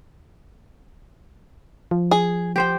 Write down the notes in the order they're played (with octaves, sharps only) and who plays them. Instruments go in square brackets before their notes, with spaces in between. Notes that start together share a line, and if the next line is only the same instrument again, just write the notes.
[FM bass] F3
[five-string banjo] G#4
[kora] G4 C5 G5